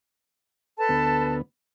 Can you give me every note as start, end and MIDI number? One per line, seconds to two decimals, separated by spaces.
0.77 1.36 69
0.77 1.36 71
0.77 1.36 81
0.89 1.42 38
0.89 1.42 59